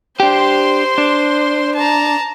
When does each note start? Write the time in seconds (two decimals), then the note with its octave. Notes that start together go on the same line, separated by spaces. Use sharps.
0.20 D4 G4 C5 C6
0.98 D4
1.75 A5 A#5